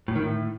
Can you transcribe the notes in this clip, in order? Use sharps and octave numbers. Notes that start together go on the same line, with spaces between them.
A2
D#3
A2